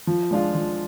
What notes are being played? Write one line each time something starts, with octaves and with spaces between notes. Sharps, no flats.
F3
G#3 D4 F4
F3